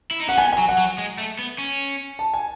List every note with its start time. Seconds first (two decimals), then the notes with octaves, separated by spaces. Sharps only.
0.11 E4
0.20 D#4
0.29 C#4 F#5
0.38 B3 G#5
0.53 G#5
0.58 F#3
0.69 F#5
0.78 F#3
0.98 G#3
1.18 A3
1.39 B3
1.58 C#4
2.19 A5
2.34 G#5